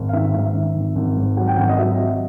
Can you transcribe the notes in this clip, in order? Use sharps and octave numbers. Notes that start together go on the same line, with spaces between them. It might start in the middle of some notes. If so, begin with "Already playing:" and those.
Already playing: G#1
F5
D#3 E5
G#2 E5
D#3
G#1
G#1
G#2
F#3 F#5
G5
G#1 F#5
D#5
F#3 E5
F#3